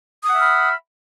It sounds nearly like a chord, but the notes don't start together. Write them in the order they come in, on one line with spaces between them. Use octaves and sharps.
D#6 F#5 E5 F6 B5